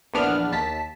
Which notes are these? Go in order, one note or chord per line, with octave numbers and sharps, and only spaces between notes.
A#1 E2 B3 D4 F6
D#2 A5 B6